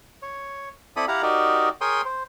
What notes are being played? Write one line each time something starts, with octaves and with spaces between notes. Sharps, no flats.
C#5
C4 E4 A4 D5 B5 D#6
E4 G4 F5 F#5 A#5
D#4 F#4 G4 A#4 D5 D#5
G#4 A#4 C#5 G5 C6 D#6
C5